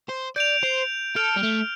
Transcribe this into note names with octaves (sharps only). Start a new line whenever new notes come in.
C5
D5 G6 D7 F7
C5
A4 F6 D7 F7
G3
A3